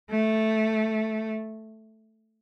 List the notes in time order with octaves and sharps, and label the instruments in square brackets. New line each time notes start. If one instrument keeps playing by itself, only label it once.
[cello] A3